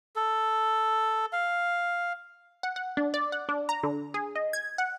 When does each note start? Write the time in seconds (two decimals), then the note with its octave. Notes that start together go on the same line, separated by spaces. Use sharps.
0.16 A4
1.33 F5
2.63 F#5
2.76 F#5
2.97 D4
3.14 D5
3.32 F#5
3.49 D4
3.69 A#5
3.83 D3
4.14 G#4
4.35 D#5
4.53 G#6
4.78 F#5